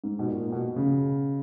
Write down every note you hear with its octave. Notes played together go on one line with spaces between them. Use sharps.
G#2
B2
A#2
B2
C#3